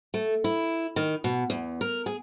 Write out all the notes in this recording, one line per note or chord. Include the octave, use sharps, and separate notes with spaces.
A3
E4
D#3
B2
E2
A#4
G#4